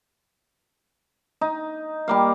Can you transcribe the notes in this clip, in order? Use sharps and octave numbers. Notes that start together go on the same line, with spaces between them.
D#4
G3 A#3 F5